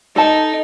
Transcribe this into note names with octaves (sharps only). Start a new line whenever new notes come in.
D#4 A4 D#5 A5